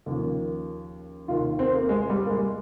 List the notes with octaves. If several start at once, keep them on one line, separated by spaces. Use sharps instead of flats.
D#2 C#3 F3 A#3
D#2 D#3 F4
C4
A#3
G#3
G3
A#3
G#3